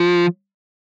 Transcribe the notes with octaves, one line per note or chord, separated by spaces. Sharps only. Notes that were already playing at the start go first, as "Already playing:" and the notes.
Already playing: F3